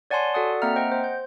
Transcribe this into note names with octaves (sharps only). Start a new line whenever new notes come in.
C#5 D5 F#5 G#5 A5 C6
F#4 A4 D5 F#5 D#6
A#3 C4 E5 F#5 A#5 F6
C5 D#5 F#5 G5
C5
G6